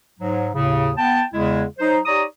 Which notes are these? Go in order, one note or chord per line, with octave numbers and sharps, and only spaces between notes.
G#2 F#3
D#2 A2 C#3
B3 G5 A5
E2 C#3 G#3 E4
F#3 D#4 C5
D#4 G4 C#5 D5 A#5 D#6